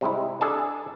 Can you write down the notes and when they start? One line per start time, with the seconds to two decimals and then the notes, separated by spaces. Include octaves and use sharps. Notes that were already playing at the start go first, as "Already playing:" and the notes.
0.01 C3 G3 G#3 D#4 E4
0.41 D4 G#4 A4 D5 G#5 A5